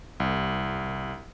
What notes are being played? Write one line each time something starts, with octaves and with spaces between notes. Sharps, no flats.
C2